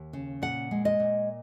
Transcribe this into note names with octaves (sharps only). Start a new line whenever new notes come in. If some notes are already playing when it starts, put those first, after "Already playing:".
Already playing: D#2
C#3
A#2 F#5
G#3
D#5
A#2